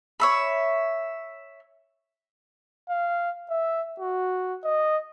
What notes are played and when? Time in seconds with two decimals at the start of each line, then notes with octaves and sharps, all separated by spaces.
0.20 C#5 E5 B5
2.89 F5
3.50 E5
4.00 F#4
4.64 D#5